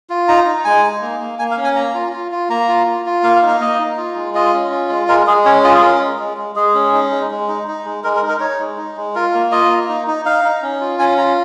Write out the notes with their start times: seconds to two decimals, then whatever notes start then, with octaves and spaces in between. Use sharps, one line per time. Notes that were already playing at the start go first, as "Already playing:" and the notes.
0.10 F4
0.28 D#4 A#5
0.47 D#4
0.65 G#3 G#5
0.83 D#4
1.01 A#3
1.20 A#3
1.39 A#3 G#5
1.51 F5
1.57 C#4
1.64 G#5
1.76 A#3 A#5
1.94 F4
2.13 F4
2.31 F4
2.49 A#3 A#5
2.69 F4
2.87 F4
3.06 F4
3.23 A#3 F5
3.36 F5
3.42 D#4
3.48 F5
3.60 A#3 D#5
3.80 D#4
3.97 F4
4.15 G#3
4.34 F4 D#5
4.53 C#4
4.71 F4
4.89 G#3
5.08 G#3 A#4
5.27 G#3 G#4
5.45 C#4 C#5
5.64 F4 D#5
5.74 G#4
5.82 C#4 A#4
6.00 G#3
6.19 G#3
6.37 G#3
6.56 G#3 G#4
6.75 C#4
6.93 D#4
7.11 G#3
7.31 G#3
7.48 D#4
7.67 D#4
7.85 G#3
8.04 G#3 A#4
8.16 A#4
8.23 D#4
8.29 A#4
8.40 D#4 C#5
8.59 G#3
8.78 D#4
8.97 G#3
9.15 F4 A#4
9.34 A#3
9.52 F4 D#5
9.70 A#3
9.89 D#4
10.08 D#4
10.25 D#4 F5
10.45 D#4
10.62 C#4
10.81 F4
10.99 C#4 G#5
11.18 F4 A#5